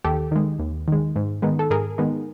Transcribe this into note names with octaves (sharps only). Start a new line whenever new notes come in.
D#2 G4 A4
D#3 G#3
D#2
D#3 G#3
G#2
D#3 G#3 B3 D#4
A4
G#2 G#4 A#4
D#3 G#3 B3 D#4